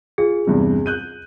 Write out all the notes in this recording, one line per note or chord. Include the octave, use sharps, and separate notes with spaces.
F4 G#4
E2 G2 C3
F#6 G6 D#7